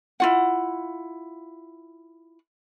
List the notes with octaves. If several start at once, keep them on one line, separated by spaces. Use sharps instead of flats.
E4 F4 F#5